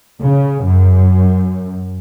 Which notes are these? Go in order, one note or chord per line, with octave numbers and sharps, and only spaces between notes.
C#3
F#2